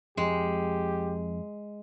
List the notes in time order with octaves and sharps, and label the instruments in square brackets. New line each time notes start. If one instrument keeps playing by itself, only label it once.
[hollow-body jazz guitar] F2 [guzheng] G#3 [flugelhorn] G4